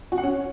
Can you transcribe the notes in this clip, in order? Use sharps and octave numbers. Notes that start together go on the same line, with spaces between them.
F#4
F#5
C#4